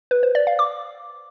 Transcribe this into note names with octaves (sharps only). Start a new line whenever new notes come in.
B4
C5
D5
F5
D6